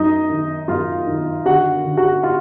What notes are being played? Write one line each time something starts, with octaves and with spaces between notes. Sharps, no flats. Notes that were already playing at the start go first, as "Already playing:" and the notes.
Already playing: F#2 D#4 D#5
D#3
F#2 F4 F5
D#3
D3 F#4 F#5
D3
F#4 F#5
F4 F5